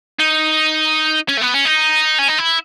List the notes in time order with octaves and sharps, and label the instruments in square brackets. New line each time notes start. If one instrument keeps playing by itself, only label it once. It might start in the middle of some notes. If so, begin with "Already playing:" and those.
[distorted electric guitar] D#4
C#4
A3
B3
C#4
D#4
C#4
D#4
E4